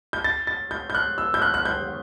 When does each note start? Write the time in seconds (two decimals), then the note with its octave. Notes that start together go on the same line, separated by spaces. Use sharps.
0.13 G6
0.24 A6
0.47 A6
0.71 G6
0.90 G6
0.95 F#6
1.18 E6
1.34 G6
1.42 F#6
1.54 F#6
1.65 G6